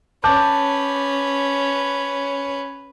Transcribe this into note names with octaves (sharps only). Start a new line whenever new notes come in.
C#4 B4 A5 D6 G6